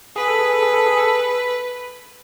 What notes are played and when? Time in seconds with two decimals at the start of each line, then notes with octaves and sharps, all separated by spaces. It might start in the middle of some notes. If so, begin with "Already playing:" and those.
0.16 G#4 B4
0.28 A4
0.39 G#4
0.51 A4
0.63 G#4
0.74 A4
0.86 G#4
0.97 A4